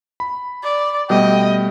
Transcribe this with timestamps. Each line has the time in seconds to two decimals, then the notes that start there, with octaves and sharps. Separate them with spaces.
0.20 B5
0.63 D5
1.10 B2 G3 A3 D#5 G5